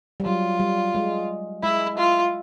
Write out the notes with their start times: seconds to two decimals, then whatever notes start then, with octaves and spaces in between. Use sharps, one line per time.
0.20 G3
0.25 F#3 F4
0.60 G3
0.95 G#3
1.63 G#3 E4
1.97 F4